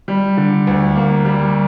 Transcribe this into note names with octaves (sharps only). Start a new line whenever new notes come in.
G3
D3
D2
A#3
G3